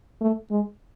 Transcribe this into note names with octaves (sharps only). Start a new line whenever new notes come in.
A3
G#3